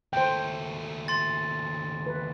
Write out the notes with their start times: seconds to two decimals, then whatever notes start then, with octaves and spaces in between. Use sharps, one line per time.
0.13 D#2 A3 C5 G5
1.08 C6 A6
2.06 B4